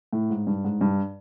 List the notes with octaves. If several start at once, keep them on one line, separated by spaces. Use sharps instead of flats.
A2
G#2
G2
G#2
G2